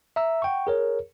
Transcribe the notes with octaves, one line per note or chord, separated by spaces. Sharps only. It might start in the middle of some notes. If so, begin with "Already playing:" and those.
E5 A#5 E6
F#5 G5 C#6
G#4 A#4 C#5